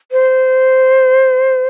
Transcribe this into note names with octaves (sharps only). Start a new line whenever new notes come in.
C5